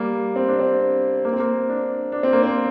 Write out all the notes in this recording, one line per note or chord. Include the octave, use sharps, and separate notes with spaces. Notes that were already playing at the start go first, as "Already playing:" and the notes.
Already playing: G3 A#3
C4
D4
C4
A#3
C4
A#3
D4
D4
C4
A#3
C4